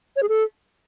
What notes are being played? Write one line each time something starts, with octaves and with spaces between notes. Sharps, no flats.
C#5
G#4
A4